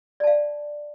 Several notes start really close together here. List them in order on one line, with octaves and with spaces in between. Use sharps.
D5 A5 F5